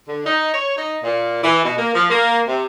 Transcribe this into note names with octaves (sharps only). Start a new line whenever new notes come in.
D3
D#4
C#5
D#4
A#2
E3
B2
A#3
F3
A#3
C3